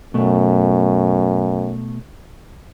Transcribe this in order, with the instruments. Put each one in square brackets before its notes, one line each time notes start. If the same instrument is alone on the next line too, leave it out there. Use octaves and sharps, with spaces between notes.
[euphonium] F#2 [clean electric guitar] B2 A3